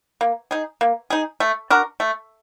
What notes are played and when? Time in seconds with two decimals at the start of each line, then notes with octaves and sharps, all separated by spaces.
0.21 A#3
0.51 D#4 G#4
0.81 A#3
1.10 D#4 G#4
1.40 A3
1.70 D4 F#4 A#4
2.00 A3